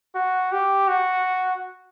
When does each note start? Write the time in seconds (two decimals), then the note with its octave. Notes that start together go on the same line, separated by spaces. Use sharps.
0.15 F#4
0.52 G4
0.88 F#4